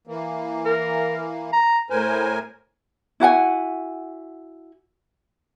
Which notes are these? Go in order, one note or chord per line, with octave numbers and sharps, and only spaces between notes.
E3 A#3
A#4
A#5
A2 A#4 C5 G#5
E4 F#4 F#5 G#5